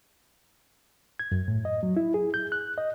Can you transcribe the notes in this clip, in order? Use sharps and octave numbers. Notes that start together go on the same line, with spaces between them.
G#6
F#2
A2
D#5
F#3
E4
G#4
G6
F#6
D#5